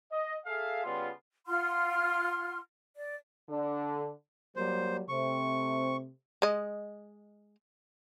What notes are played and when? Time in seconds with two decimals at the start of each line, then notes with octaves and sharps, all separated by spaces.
0.11 D#5
0.46 G#4 A4 E5 F5
0.84 C#3 G3 B3 F4
1.46 F4 F#5 C6 F6
2.95 D5
3.48 D3
4.56 F#3 G3 A#3 C5
5.09 C3 A3 C4 C#6
6.42 G#3 D#5